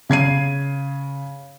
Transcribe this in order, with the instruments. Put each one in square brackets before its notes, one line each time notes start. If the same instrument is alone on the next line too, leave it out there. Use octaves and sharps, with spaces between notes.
[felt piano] C#3 G#6 C7 D#7